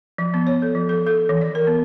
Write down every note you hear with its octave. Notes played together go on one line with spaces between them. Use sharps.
F3
B3
C#5
A4
F3
A4
A4
E3
D5
A#4
B3